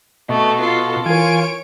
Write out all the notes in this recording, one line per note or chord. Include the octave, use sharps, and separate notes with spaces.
B2 A3 D#5 C#6
F4 A4
E3 F4 A#4 C#5 G#5 D7